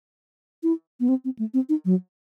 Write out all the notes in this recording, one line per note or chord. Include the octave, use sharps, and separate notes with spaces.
E4
B3
C4
C4
A3
C4
D#4
F#3